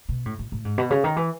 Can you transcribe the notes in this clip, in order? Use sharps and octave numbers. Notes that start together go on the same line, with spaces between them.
B2
A2
A2
A2
G#2
B2
C#3
D#3
E3